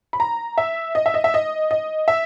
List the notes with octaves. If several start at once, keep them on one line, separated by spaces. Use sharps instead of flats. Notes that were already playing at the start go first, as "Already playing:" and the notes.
B5
A#5
E5
D#5
E5
D#5
E5
D#5
D#5
E5